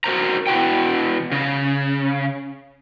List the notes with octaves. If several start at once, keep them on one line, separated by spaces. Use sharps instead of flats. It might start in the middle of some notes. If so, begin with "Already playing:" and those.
F#4 A#4 C5 A#5
B2 E4 F#4 G5
C#3